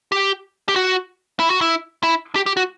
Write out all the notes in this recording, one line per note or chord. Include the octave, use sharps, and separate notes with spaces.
G4
G4
F#4
E4
F#4
E4
E4
G4
G4
F#4